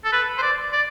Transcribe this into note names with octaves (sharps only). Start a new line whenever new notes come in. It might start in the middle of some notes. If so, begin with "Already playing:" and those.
A4
B4
C5
D5
D5